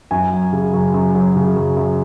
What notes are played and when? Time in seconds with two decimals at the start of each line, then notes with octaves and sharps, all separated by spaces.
0.11 F#2 G#5
0.32 F#3
0.53 C#3
0.73 F#2
0.94 F#2
1.14 F#3
1.36 C#3
1.56 F#2
1.77 F#2